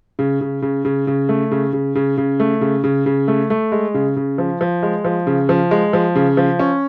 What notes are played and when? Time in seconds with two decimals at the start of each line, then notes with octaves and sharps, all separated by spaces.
0.19 C#3
0.41 C#3
0.62 C#3
0.85 C#3
1.07 C#3
1.29 A3
1.51 C#3
1.73 C#3
1.95 C#3
2.17 C#3
2.40 A3
2.61 C#3
2.84 C#3
3.06 C#3
3.28 A3
3.50 A3
3.72 G#3
3.94 C#3
4.16 C#3
4.38 F3
4.61 F3
4.83 G#3
5.05 F3
5.27 C#3
5.49 F3
5.71 G#3
5.93 F3
6.16 C#3
6.37 F3
6.59 C#4